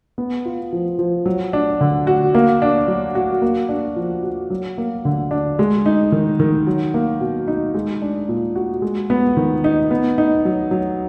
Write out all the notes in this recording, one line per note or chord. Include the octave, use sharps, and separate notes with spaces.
B3
F4
F3
F3
F#3
D4
D3
F#4
A#3
D4
F#3
F#4
A#3
D4
F3
F#4
F#3
A#3
D3
D4
G#3
D#4
D#3
D#3
F#3
A#3
B2
D#4
G#3
D4
A#2
F#4
G#3
B3
D#3
D#4
B3
D#4
F#3
F#3